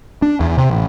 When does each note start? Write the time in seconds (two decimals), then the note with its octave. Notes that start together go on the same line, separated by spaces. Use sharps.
0.22 D4
0.40 E2
0.57 C3
0.71 A1